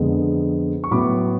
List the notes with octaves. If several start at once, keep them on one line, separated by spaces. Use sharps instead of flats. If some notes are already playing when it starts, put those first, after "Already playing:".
Already playing: F2 D3 G#3 B3
C#6
A2 F#3 B3 B5 D6